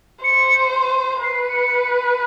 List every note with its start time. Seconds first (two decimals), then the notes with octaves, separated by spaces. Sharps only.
0.24 C5 C#7
1.23 B4 C7
1.49 C#7